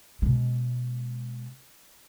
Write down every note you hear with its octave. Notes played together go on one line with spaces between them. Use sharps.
B2 G#3